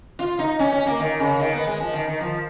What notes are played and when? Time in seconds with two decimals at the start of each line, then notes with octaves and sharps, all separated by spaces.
0.19 F4
0.39 D#4
0.59 C#4
0.73 C#4
0.86 A#3
1.00 D#3
1.20 C#3
1.40 D#3
1.53 B3
1.67 G#3
1.80 F3
1.93 D#3
2.07 D#3
2.20 F3